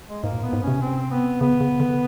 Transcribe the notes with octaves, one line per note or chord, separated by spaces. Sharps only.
G#3
G#2 A#3
A#2
A2 B3
G#2
C3 C#4
C4
B3
C#3 B3
C#3
D3